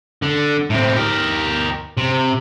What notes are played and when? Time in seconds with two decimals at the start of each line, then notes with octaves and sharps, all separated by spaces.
0.22 D3
0.70 A2 C4
0.97 G4 A#4
1.98 C3